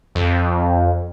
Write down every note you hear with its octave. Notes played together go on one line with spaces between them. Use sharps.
F2